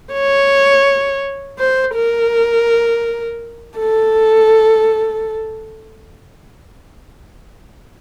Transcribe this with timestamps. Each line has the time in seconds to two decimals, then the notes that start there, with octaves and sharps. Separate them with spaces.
0.13 C#5
1.59 C5
1.95 A#4
3.79 A4